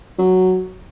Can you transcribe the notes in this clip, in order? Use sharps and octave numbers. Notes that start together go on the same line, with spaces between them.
F#3